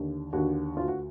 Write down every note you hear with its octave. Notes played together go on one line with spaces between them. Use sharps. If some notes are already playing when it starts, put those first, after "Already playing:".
Already playing: D#2 D3
D#2 D3 F#4
D2 D3 F4
F#4